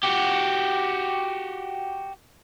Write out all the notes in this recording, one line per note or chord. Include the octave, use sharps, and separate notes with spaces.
F#4 G4